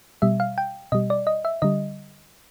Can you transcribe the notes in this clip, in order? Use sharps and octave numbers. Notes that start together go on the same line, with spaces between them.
B2 G3 E5
F5
G5
B2 G3 D#5
D5
D#5
E5
D3 G3 D#5